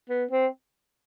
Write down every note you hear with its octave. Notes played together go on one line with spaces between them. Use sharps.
B3
C4